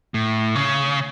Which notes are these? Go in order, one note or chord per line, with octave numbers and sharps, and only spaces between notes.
A2
C#3